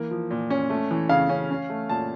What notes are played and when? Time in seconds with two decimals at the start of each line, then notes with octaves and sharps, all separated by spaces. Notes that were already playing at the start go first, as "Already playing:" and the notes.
Already playing: E3 A#3
0.11 F3
0.31 A#2
0.50 C#4
0.70 A3
0.91 E3
1.09 C#3 F5
1.29 C#4
1.51 C#4
1.70 A3
1.89 A#2 A5